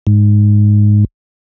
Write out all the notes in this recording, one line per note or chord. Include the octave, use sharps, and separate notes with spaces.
G#2